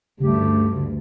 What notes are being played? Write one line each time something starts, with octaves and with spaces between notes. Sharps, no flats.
D2 G2 C#3 A3 G4